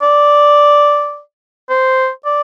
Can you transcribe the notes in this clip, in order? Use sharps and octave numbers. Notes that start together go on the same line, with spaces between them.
D5
C5
D5